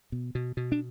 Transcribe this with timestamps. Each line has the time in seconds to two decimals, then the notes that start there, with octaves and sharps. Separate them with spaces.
0.12 B2
0.35 B2
0.57 B2
0.72 D4